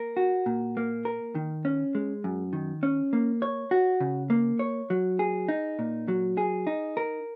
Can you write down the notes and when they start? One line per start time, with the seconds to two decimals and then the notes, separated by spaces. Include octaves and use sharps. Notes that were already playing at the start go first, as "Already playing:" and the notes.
Already playing: A#3 A#4
0.17 F#4
0.46 A#2
0.77 A#3
1.05 A#4
1.35 D#3
1.65 C#4
1.95 G#3
2.24 F#2
2.53 D#3
2.83 C#4
3.13 A#3
3.42 C#5
3.71 F#4
4.00 C#3
4.30 A#3
4.59 C#5
4.90 F#3
5.19 G#4
5.48 D#4
5.79 A#2
6.08 F#3
6.37 G#4
6.67 D#4
6.97 A#4